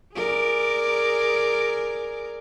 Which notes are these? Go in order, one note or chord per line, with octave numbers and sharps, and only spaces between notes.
G#4 A#4 D5